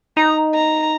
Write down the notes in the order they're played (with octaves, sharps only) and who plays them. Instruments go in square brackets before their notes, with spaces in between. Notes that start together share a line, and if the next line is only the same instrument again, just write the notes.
[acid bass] D#4 [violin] A#5
[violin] A#5